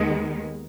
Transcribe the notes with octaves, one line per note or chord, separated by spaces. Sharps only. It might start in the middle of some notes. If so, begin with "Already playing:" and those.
Already playing: D#2 D#3 G#3 B3